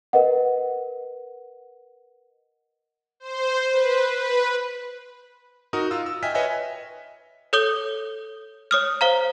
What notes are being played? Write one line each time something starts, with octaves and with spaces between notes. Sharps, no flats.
A#4 B4 D#5 F#5
C5
B4
B4
D#4 F#4 A#4 D#6
F4 E6
E6
D#5 E5 G5 G#5 F6 B6
B4 C#5 D#5 E5 G#5
A4 C#5 D#6 G6 G7
C#5 D#6 F6
C5 F5 A#5